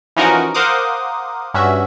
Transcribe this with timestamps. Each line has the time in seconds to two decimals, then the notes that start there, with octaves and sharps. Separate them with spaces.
0.16 E3 F3 C#4 D#4 F#4 A#4
0.54 A#4 C5 F5 F#5 D6 D#6
1.54 G2 C#4 F#4 E5